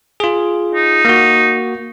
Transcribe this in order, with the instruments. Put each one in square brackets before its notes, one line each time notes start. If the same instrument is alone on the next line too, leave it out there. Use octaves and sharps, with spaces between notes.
[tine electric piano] F4 G#4
[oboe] D#4
[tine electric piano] A#3 F#4